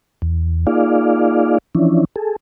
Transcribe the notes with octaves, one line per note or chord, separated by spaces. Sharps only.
E2
A#3 D#4 F4 G#4 D5 F5
E3 F3 C#4 D4 E4
G#4 A4